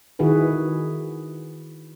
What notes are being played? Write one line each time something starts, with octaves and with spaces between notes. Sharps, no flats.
D#3 E4 F#4 G#4 B4